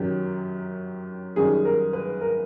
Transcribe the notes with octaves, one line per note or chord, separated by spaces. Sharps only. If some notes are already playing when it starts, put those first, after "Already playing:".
Already playing: F#2 D#3 F#3 G4
F#2 D#3 G3 G#4
A#4
B4
A#4